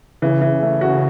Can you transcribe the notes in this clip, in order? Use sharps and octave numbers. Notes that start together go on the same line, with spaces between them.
C#3 E3
E3
A3
F#4